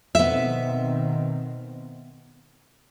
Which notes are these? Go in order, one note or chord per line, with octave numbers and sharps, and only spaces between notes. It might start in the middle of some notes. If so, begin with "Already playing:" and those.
B2 D#3 B3 C4 E5